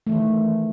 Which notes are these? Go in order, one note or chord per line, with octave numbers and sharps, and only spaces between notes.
D#3 E3 A3